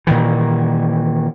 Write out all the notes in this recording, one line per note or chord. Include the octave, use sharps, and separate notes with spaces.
A#2 D#3 E3